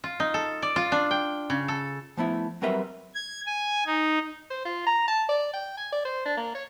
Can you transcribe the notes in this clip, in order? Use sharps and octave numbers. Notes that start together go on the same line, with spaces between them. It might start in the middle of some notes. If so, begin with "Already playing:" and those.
F4
D#4
A4
D5
F4
D4
G5
C#3
A4
F3 A3 B3 E4
F#3 G3 C4 A#4 B4 E5
G#6
G#5
D#4
C5
F4
A#5
A5
D5
G5
G#5
D5
C5
D4
A#3
C#5